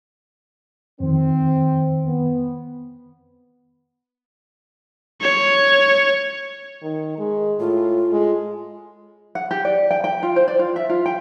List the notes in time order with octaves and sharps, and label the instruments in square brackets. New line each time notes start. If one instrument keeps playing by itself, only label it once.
[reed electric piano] F2 D#3 [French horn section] C4
[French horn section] B3
[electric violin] C#5
[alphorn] D#3
G#3
[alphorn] A2 [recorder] F4
[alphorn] G#3
[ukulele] F#5
G4
D5
G5
G5
F4
C5
D5
F4
E5
F4
G5